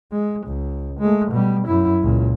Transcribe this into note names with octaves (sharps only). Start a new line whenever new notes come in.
G#3
C#2
G#3 A3
B2 G3
F#2 E4
C#2 A#2